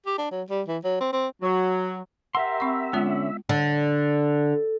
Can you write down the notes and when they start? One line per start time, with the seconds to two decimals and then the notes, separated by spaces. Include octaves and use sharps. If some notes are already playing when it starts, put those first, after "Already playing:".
0.06 G4
0.18 D4
0.31 F#3
0.50 G3
0.67 E3
0.84 F#3
1.00 C4
1.13 C4
1.42 F#3
2.35 G4 A#4 E5 F#5 C6 B6
2.60 C4 C#6
2.93 D3 G#3 B3 C#4 F4
3.49 D3